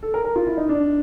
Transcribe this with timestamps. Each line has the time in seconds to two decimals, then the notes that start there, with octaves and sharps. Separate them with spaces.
0.03 A4
0.14 A#4
0.25 A#4
0.36 F4
0.47 E4
0.57 D#4
0.69 D4